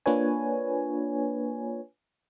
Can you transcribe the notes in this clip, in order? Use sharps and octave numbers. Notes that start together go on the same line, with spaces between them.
A#3 D4 F4 B4 C#5 G#5